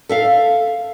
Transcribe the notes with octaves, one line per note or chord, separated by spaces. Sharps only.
A4 E5 F5